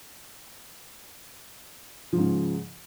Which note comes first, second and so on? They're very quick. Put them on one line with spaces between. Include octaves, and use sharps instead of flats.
F3 G#2 C#3